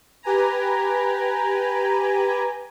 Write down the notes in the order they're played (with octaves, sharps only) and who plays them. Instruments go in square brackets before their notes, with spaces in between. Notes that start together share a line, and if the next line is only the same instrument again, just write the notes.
[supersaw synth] G4 B4 G#5 A#5